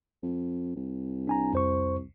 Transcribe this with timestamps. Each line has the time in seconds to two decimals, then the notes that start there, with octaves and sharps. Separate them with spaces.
0.23 F2
0.76 C2
1.27 D4 G#5 A#5
1.53 F2 C5 C#6